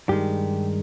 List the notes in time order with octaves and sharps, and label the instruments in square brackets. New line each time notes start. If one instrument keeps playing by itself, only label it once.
[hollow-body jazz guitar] G2 D#3 G#3 G4